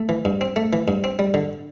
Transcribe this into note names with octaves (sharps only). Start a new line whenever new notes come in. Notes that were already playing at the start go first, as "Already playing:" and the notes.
Already playing: A3
E3
G2
C4
A3
E3
G2
C4
G3
D3